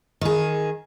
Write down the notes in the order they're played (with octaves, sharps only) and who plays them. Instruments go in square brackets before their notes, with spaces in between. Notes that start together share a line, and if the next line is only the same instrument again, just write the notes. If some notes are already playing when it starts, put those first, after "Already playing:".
[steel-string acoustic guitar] D#3 G#4